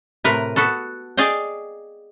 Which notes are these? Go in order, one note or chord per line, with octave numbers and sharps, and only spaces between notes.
A2 C3 A#4 B4
B3 F#4 A4
G#4 D5 D#5 F5 G5